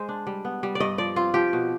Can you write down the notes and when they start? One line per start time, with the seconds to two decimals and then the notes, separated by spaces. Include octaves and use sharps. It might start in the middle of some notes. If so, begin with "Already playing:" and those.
Already playing: G#3 C5
0.09 D4
0.27 G3
0.45 B3
0.63 G3
0.75 D5
0.80 G2 D#5
0.98 F3 D5
1.16 C4 F4
1.34 F3 G4
1.53 B2